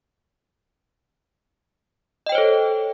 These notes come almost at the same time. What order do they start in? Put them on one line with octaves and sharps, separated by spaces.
D#5 G5 C5 C#5 A4